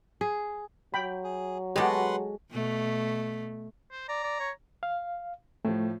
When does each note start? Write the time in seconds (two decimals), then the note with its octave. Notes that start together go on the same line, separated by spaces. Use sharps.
0.21 G#4
0.94 F#3 G5 B5
1.24 G#4
1.76 G#3 F#4 G4 A4 B4 F#5 C6
2.51 B2 A3
3.91 C5
4.09 D5 A#5
4.23 D5
4.40 C#5
4.83 F5
5.65 A2 F3 A3